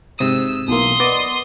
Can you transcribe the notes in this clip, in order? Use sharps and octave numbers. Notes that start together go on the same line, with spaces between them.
G#2 C3 D#6 E6
B1 E3 A#3 C6 D#6
B3 D5 D#5